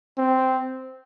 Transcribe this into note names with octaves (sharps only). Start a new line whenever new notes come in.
C4